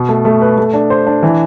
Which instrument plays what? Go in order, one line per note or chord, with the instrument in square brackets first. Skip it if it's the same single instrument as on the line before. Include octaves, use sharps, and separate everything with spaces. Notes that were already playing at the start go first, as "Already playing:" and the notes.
Already playing: [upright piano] B2
A3
A3
B4
A3
D4
C5
D4
E3